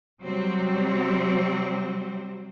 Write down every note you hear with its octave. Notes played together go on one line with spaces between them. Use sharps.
C3 F#3 G3 C4